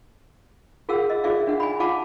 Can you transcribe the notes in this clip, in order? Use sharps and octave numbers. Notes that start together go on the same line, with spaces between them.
F4 G#4 A#4 F5 F#5 E6
D#5
F4 G#4 D5 E5 F5
D4 F#5
G#5 B5
F4 F5 F#5 A5 B5 D6